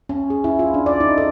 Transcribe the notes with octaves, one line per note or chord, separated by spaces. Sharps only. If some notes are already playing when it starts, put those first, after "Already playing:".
C#4
G#4
E4
F4
D4
D5
D#4
A4